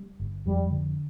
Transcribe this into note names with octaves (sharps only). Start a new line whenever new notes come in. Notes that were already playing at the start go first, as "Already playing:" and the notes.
Already playing: G3
G1
F2 G3
D3